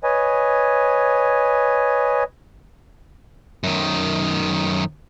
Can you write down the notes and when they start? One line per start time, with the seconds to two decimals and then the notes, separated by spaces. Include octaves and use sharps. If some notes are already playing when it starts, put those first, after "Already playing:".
0.04 B4 C#5 D#5 G#5
3.64 F#2 D#3